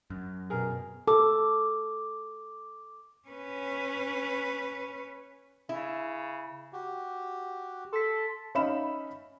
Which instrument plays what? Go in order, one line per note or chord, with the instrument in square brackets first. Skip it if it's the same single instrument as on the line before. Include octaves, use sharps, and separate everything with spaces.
[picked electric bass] F#2
[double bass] B2 [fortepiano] G#4 A#4
[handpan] A4 [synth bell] D6
[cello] C#4 B4
[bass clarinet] C#3 [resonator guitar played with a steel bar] E4
[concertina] F#4 G4
[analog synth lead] A4 [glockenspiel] C6 B6
[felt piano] C#4 D#4 E5 F5 B5 E7